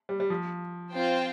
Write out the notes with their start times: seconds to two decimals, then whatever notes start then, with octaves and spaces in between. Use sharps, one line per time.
0.09 G3
0.20 G3
0.30 F3
0.93 C4 F4 C5 G5